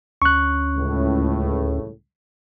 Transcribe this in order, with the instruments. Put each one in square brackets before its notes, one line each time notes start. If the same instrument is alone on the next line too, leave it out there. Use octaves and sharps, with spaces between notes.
[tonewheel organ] D2 C#4 [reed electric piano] C#6 F#6
[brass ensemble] C#2 A2